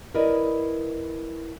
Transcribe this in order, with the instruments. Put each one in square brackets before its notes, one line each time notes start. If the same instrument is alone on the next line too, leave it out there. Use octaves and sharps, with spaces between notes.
[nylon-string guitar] E4 A#4 B4 D5 D#5